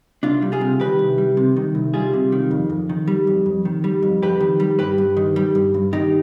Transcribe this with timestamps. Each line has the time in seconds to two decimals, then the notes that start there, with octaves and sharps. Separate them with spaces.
0.23 C2 D4 F4
0.42 G3
0.52 F4 G#4
0.61 C3
0.80 D#3 G4 B4
0.99 C2
1.18 G3
1.37 C3
1.56 D#3
1.75 C2
1.94 G3 F4 G#4
2.13 C3
2.32 D#3
2.51 F2
2.70 F2
2.89 D#3
3.08 G3
3.27 F2
3.46 F2
3.65 D#3
3.84 G3
4.02 F2
4.22 F2 G4 B4
4.40 D#3
4.60 G3
4.79 G2 G4 B4
4.98 G2
5.17 D#3
5.36 G3
5.55 G2
5.74 G2
5.93 D#3 D#4 G4